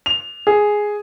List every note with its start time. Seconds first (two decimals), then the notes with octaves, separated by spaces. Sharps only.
0.06 F7
0.47 G#4